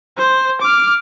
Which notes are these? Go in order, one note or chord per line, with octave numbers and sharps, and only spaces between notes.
C5
D6 F6